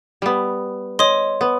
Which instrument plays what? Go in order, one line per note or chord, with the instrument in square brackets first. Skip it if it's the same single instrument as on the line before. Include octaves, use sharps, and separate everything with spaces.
[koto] G3 B3
[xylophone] C#5 C6 [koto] D#5
[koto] B3